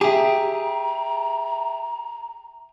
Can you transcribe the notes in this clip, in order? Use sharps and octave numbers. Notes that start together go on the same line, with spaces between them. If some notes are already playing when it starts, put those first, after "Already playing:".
G4 G#4 E5 G5 A#5